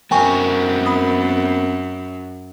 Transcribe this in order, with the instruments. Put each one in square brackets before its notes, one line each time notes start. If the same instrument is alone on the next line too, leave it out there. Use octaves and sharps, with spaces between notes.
[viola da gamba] F#2 [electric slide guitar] B3 C4 A#4 [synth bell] G5 G#5 C#6
[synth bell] B5 D#6